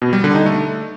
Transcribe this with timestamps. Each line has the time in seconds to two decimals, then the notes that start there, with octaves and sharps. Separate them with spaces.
0.02 B2
0.13 G3
0.24 D3
0.35 D#4
0.46 A3